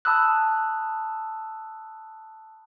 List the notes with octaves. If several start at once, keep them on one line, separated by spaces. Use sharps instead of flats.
A5 B5 D#6 E6 F#6